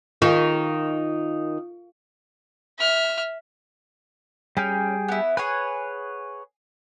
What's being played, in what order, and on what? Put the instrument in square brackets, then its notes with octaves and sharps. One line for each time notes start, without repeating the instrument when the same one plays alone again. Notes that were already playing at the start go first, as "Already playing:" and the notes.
[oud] D#3 [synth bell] F4 F5
[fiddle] E5 F6
[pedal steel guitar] G3 G#4 G5 [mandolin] C#4
[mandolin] B3 E4
[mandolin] G#4 F#5 G#5 [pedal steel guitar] B4 C#5